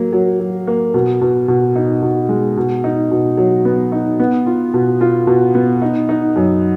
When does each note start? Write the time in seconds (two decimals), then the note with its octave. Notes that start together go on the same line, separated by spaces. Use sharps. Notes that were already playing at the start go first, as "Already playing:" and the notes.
Already playing: F#3 A#3
0.13 F#3
0.40 F#3
0.67 A#3
0.94 B2
1.21 B2
1.48 B2
1.76 D#4
2.02 B2
2.29 G#3
2.57 B2
2.84 D#4
3.11 B2
3.37 F#3
3.65 B3
3.92 D#4
4.20 B3
4.46 F4
4.74 B2
5.01 F4
5.27 B2
5.55 B3
5.82 D#4
6.09 D#4
6.36 F#2